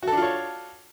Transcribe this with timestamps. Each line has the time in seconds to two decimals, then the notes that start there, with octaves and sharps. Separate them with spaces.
0.03 F#4
0.08 A4
0.12 D4
0.17 F4
0.22 C#5